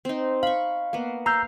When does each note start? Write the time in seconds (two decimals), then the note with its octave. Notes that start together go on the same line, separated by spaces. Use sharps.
0.05 C4 D#4
0.43 F5 B5 C#6
0.93 A#3 B3
1.26 F5 A#5 E6 G6